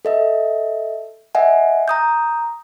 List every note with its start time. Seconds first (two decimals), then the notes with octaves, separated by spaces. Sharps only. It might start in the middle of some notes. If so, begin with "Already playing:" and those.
0.05 A4 D#5 E5
1.35 D#5 E5 F#5 G#5
1.88 A#5 D#6 G6